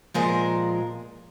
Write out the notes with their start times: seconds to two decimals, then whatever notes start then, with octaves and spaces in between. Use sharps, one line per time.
0.14 A#2 F3 G#3 A#4